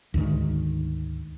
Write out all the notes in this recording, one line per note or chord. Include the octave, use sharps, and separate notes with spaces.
D2 G#2 D#3